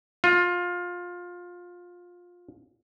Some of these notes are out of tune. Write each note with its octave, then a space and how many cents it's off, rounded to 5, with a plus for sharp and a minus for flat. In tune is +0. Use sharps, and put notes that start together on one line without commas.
F4 +20